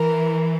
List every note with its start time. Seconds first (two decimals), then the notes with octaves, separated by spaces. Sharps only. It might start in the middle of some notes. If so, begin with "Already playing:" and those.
Already playing: E3 A#4